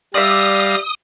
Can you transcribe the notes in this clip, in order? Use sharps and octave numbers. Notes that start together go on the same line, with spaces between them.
G3 D5 E5 F5 D#6 A#6